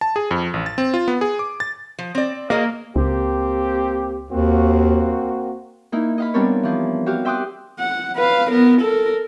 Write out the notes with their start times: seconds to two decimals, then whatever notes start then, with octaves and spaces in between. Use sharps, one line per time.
0.01 A5
0.16 G#4
0.31 F2
0.54 A1
0.66 A6
0.78 C4
0.94 F4
1.08 B3
1.21 G#4
1.39 D6
1.60 A6
1.99 F3
2.15 C4 D5
2.50 A#3 F#4 G#4 D#5
2.96 C#2 A#3 C4 G4
4.31 D#2 A#3 C4 F#4
5.92 A#3 D#4 E4
6.18 D#5 F5 B5
6.34 G3 B3 C4 D4 A#4 C#5
6.63 E3 F3
7.06 F#4 G4 F5
7.25 E5 G5 C6 D6 D#6 F#6
7.79 F#5
8.16 B4 F5
8.50 B3 A#4
8.81 A4 A#4